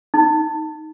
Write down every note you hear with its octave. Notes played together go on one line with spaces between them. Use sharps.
D#4